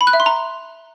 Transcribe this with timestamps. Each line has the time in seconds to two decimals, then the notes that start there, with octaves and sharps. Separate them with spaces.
0.01 B5
0.07 F#6
0.13 E5
0.20 C6
0.26 A#5